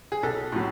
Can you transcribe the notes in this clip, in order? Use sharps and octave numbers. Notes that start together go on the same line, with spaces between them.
G#4
B1 A4
A2 F#3